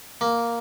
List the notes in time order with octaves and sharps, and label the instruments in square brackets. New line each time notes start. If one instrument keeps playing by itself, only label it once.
[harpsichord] A#3